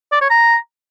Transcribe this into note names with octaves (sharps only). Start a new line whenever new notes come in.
D5
C#5
A#5